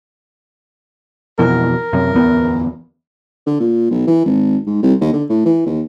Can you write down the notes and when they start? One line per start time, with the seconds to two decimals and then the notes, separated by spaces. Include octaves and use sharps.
1.39 F2 B2 E3 A#4
1.93 F#2 C3
2.13 D1 E2 B3
3.46 D3
3.60 A#2
3.90 B1
4.07 E3
4.26 G#1
4.67 G#2
4.83 C2
5.01 D#2
5.13 D3
5.29 A2
5.46 E3
5.66 D#2